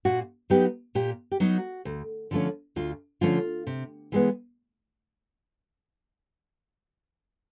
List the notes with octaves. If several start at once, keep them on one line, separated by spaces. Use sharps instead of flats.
A#2 F#4
F#3 B3 D#4 G4
A#2 G4
G4
F#3 B3 D#4 F#4
D2
D3 F3 A3 C#4
D2 F4
D3 F3 A3 C#4 F4
C3
E3 G#3 B3